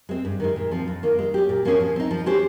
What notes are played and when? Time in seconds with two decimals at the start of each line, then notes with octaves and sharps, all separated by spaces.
0.09 G#3 C4
0.25 G2
0.40 D#3 G#3
0.56 A#2
0.71 F3 C4
0.87 F2
1.03 D#3 A#3
1.19 G#3
1.34 C#4 G4
1.49 A#2
1.65 F3 A#3 C#4 G#4
1.80 F3
1.96 C4 D#4
2.11 F3
2.26 G#3 C#4 G4 C5